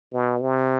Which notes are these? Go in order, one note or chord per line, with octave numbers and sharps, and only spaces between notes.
B2
C3